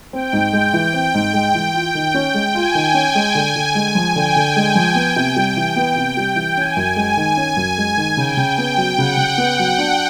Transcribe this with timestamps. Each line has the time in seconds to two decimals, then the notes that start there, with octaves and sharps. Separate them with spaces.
0.13 C4 G5
0.33 G#2
0.53 G#3
0.73 E3
0.93 C4
1.14 G#2
1.33 G#3
1.55 E3
1.74 F4
1.95 D#3
2.14 C#4
2.34 G#3
2.55 F4 G#5
2.75 D#3
2.94 C#4
3.15 G#3
3.35 D3
3.56 D3
3.75 G#3
3.95 F3
4.15 D3 G5
4.36 D3
4.56 G#3
4.75 F3
4.95 B3
5.16 C3
5.36 G3
5.57 E3
5.76 B3
5.96 C3
6.17 G3
6.36 E3
6.57 C#4 G#5
6.76 F#2
6.96 G#3
7.17 D#3
7.37 C#4
7.56 F#2
7.78 G#3
7.97 D#3
8.17 C#3 G5
8.37 C#3
8.57 B3 G5
8.77 F#3
8.98 C#3 F#5
9.17 C#3
9.38 B3 G5
9.59 F#3
9.79 D4